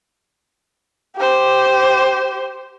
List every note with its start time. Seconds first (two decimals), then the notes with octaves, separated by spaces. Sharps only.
1.17 G4 C5